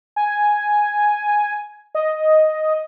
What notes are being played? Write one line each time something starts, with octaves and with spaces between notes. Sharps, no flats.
G#5
D#5